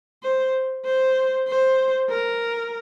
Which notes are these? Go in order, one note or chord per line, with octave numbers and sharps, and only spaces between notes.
C5
C5
C5
A#4